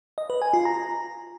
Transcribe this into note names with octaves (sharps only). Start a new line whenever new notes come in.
D#5
B4
G#5
F4
A#5